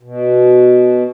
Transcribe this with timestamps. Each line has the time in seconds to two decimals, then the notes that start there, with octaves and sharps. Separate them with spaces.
0.03 B2